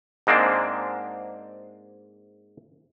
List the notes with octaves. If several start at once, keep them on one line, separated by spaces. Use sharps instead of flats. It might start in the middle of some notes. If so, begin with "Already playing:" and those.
G#2 G#3 A#3 C4 D4